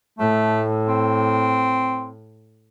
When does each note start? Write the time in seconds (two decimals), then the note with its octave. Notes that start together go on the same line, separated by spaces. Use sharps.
0.19 A2 A3
0.88 C4